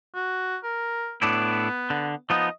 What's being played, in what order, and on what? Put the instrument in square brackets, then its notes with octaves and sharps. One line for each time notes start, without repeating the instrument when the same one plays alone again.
[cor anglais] F#4
A#4
[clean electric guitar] A2 D4 E4 [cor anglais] B3
[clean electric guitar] D3
[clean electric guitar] F3 B3 D#4 [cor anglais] D#5